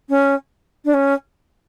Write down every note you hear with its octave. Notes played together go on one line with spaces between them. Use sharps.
C#4
D4
C#4